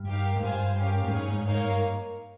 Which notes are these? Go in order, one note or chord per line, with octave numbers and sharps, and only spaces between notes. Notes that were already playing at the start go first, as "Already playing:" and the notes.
Already playing: G2
D#4 G4 A#4 F5
G#2
G2 F4 C5 F5 G#5
C#4 G4 A#4 F5
G#2
G2 D#4 G#4 C#5
G#2
G#2 A#3 D#4 A#4 C#5 F5
G2